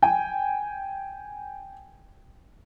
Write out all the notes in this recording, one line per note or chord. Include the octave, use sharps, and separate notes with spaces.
G5 G#5